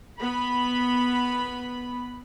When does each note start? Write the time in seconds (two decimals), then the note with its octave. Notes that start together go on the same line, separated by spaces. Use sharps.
0.20 B3 B5